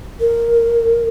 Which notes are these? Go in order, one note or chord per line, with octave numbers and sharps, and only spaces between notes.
A#4